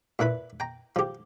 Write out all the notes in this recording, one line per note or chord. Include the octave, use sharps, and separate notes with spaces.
A#2 E4 B4 B5
G5 A#5
F3 G4